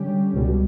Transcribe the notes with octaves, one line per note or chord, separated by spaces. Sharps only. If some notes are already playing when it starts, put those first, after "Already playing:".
Already playing: D3 G3 C#4 G4
C#2 B2 G3